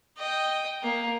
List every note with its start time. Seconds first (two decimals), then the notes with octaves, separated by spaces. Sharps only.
0.18 D#5 G5
0.83 A#3